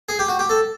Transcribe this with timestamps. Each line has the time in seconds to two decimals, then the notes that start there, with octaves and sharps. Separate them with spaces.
0.09 G#4
0.19 G4
0.28 F#4
0.39 G4
0.49 A4